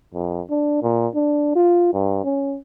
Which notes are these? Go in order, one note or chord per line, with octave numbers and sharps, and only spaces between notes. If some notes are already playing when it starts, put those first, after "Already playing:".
F2
D4
A#2
D4
F4
G2
C#4